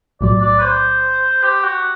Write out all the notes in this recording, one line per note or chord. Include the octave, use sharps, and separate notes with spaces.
B1 A2 F#3 D5
D5
B4
C5
G4
F#4